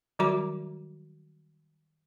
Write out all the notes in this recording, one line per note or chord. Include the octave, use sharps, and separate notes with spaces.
D#3 F#3 G3 F#4 A#5 D6